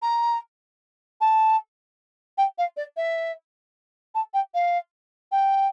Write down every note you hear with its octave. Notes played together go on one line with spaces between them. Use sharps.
A#5
A5
G5
F5
D5
E5
A5
G5
F5
G5